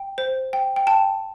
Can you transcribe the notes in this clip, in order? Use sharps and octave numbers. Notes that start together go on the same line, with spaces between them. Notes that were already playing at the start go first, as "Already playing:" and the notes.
Already playing: G5
C5
G5
G5
G5 A5